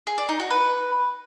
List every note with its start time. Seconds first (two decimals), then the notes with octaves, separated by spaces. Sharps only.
0.07 G#4
0.18 D5
0.29 D#4
0.40 F#4
0.51 B4